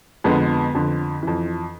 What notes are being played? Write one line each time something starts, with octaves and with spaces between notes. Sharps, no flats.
F2 D3 G#3 B3
F2 D3
F2 E3